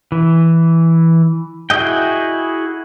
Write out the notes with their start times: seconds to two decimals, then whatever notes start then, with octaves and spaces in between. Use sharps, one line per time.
0.12 E3
1.70 E4 F#4 G#4 D#5 G5